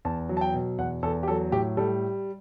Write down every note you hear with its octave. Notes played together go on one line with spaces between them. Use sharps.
E2 A5
F#3
A5
G5
B2
E2 F#5
E2 A4
G4
F#3 A4
A2 G4
G3 A4